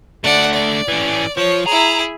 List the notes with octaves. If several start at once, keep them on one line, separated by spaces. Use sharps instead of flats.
A3 D4 D5 F#5
D5
E3 C#4
F3 C#5
E4 G#4 A#5